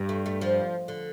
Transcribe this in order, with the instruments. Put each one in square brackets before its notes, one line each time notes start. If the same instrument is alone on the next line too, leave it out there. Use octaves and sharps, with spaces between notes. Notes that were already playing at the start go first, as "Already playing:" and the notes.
Already playing: [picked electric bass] G2
[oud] A3
A3
F3
D3